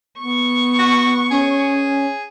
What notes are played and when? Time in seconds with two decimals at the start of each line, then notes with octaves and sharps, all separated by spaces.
0.19 B3 C#6
0.79 F#4
1.31 C#4 G#4